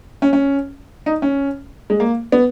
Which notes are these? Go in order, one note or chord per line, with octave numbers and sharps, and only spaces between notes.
C#4
C#4
D#4
C#4
G#3
A#3
B3